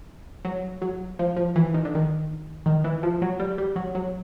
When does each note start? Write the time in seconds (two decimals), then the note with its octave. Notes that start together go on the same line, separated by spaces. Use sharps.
0.45 F#3
0.82 F#3
1.19 F3
1.36 F3
1.56 E3
1.74 D#3
1.85 D3
1.95 D#3
2.66 D#3
2.84 E3
3.03 F3
3.22 F#3
3.40 G3
3.58 G3
3.76 F#3
3.95 F#3